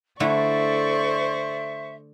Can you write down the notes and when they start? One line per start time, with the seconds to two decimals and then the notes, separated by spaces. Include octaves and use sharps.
0.20 D3 A3 E4 A4 C5 D5 E5 C#6